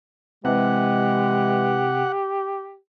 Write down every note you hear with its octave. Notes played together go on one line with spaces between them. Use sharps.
C3 E3 G#3 G4 F#5